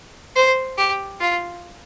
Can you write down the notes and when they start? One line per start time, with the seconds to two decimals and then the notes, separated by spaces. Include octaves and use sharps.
0.36 C5
0.78 G4
1.21 F4